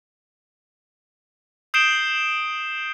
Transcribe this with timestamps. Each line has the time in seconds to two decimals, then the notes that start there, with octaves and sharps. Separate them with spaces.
1.74 D#6 G6 C7 D7 E7 G7